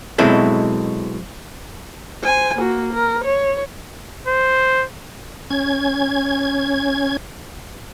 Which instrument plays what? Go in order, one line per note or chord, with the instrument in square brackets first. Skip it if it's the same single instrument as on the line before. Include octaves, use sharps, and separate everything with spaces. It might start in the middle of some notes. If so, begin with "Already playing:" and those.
[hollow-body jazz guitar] B2 F#3 G#3 C4 E4 A4
[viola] C5 G#5
A#3 F#4
A#4
C#5
[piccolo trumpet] C5
[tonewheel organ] C#4 G#6